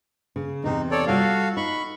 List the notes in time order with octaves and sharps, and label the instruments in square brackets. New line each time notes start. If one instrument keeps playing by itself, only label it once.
[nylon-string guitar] C#3
[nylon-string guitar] E2 C3 [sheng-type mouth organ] D#4
[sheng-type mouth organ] A4 C#5 D5
[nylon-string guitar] G3 F4 [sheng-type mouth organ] F#4 A4 F5
[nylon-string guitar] D#4 [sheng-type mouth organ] B5 C#6